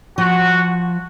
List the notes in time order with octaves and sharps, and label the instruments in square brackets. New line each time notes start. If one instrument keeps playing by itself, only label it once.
[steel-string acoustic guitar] F3 [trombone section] F#4